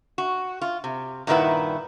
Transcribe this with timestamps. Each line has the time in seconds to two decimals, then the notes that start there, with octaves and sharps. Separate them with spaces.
0.18 F#4
0.61 F4
0.84 C3
1.27 G2 A#2 D#3 E4 B4 F#5